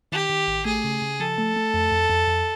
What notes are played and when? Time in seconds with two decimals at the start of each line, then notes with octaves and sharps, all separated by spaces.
0.12 D#3 G4
0.30 D#3
0.47 A1
0.65 A3 G#4
0.84 C#3
1.02 C#3
1.20 F3 A4
1.38 A3
1.56 A3
1.74 F2
1.91 F2
2.10 F2
2.27 F2